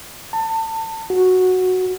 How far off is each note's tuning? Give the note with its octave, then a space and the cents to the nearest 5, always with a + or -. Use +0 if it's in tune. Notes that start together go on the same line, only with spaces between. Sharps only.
A5 +30
F#4 -5